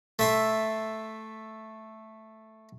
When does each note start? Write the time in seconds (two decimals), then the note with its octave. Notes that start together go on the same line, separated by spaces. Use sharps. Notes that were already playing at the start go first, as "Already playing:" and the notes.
0.19 A3 E5 C6